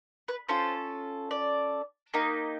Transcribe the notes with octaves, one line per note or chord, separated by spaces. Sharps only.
B4
C#4 F4 A4 C5
D5
A#3 D#4 G4